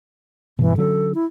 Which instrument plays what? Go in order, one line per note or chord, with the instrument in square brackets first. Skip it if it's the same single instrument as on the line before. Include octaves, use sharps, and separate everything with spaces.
[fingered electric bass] G2 B2 [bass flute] E3
[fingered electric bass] D3 F#3 C#4 [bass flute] A4
[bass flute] E4